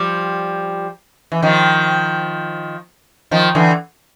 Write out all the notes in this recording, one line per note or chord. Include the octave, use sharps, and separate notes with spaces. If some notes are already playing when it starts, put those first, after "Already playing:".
Already playing: F3 G3
E3
D#3 F3
D#3 F3
D3 E3